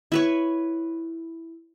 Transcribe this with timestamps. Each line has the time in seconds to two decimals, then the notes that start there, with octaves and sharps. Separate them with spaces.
0.12 E4 B4 C#5